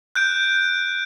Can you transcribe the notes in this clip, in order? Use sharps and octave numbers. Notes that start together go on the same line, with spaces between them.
F#6 G6 D7